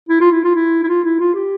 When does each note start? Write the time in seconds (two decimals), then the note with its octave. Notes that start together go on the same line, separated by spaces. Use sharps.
0.09 E4
0.20 F4
0.31 E4
0.44 F4
0.55 E4
0.83 E4
0.88 F4
1.04 E4
1.19 F4
1.35 G4